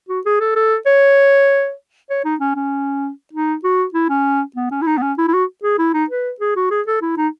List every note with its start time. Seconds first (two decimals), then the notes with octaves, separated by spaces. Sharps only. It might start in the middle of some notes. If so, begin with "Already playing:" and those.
0.09 F#4
0.25 G#4
0.40 A4
0.56 A4
0.86 C#5
2.10 C#5
2.25 D#4
2.40 C#4
2.56 C#4
3.33 D#4
3.64 F#4
3.94 E4
4.09 C#4
4.56 B3
4.71 C#4
4.82 E4
4.87 D#4
4.97 B3
5.02 C#4
5.18 E4
5.28 E4
5.33 F#4
5.63 G#4
5.78 E4
5.94 D#4
6.10 B4
6.40 G#4
6.56 F#4
6.71 G#4
6.87 A4
7.02 E4
7.17 D#4